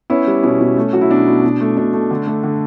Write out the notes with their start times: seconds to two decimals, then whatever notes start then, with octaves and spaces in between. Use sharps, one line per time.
0.10 B3 C#4 E4
0.27 G3
0.43 B2 C#4
0.61 B2
0.77 A3
0.93 F#3 F#4
1.01 E4
1.10 B2 D4
1.28 B2
1.44 B2
1.61 A3
1.77 B2 D4
1.93 A3
2.11 D3
2.27 A3
2.44 D3